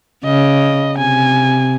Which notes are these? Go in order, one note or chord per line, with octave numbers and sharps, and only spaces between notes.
C#3 D#5
C3 G#5